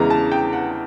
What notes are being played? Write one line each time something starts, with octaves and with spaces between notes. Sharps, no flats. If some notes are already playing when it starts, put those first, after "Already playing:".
Already playing: E2 C#3 E3 G#3 A#5
A5
G5
F#5